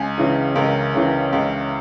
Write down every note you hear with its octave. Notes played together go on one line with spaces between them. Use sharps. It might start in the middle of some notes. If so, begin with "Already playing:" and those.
Already playing: C#2 G#5
C#3 E3
C#2 A#4
C#3 E3
C#2